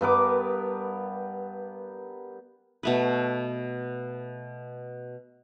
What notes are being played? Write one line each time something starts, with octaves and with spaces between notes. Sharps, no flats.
G2 B3 A#4 D6
B2 A3 B4